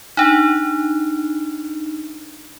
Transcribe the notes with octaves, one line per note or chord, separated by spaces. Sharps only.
D4 D#4